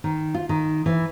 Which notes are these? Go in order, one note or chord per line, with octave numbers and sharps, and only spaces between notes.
D#3
F4
D#3
E3